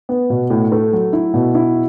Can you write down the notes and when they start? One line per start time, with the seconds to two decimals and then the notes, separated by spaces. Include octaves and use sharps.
0.09 B3
0.30 B2
0.50 A2
0.72 A3
0.93 F#3
1.13 E4
1.34 B2
1.55 E4